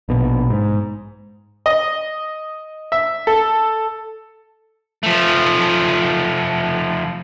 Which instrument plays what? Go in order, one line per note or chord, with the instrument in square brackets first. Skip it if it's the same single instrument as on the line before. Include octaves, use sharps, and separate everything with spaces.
[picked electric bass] A#1 B2
G#2
[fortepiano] D#5
E5
A4
[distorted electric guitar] F3 A3